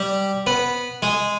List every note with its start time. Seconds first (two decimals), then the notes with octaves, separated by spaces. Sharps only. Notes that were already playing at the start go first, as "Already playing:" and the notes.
Already playing: G3 G4
0.47 B3 B4
1.02 G#3 G#4